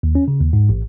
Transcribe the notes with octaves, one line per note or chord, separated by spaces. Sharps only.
D#2
C#4
C#3
D#2
G#2
A1